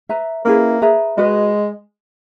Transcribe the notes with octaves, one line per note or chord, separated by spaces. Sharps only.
B4 E5 A#5
A#3 C#4 E4 G#4 B4
G#4 B4 E5 A#5
G#3 F#4 B4 D#5